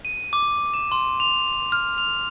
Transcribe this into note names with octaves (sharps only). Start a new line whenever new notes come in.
D#7
D6
E7
C6
F7
F6
F7